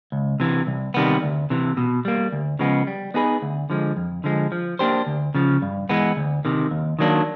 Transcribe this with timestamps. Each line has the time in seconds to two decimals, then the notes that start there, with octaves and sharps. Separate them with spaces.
0.12 C#2
0.40 C3 E3
0.67 C2
0.94 C3 D#3 G3 B3
1.23 D2
1.50 C3 E3
1.77 B2
2.05 G3 A#3
2.32 D2
2.59 C#3 F3 G#3 B3
2.87 G3
3.14 B3 D#4 G#4 B4
3.42 D2
3.70 D3 F3 G#3
3.96 F2
4.24 D3 F3 G#3
4.52 F3
4.79 A#3 D4 G4 C5
5.07 D2
5.35 C#3 F3
5.62 G2
5.89 E3 G#3 B3
6.17 D2
6.45 C3 D#3
6.71 D#2
6.99 D#3 F#3 A#3 D4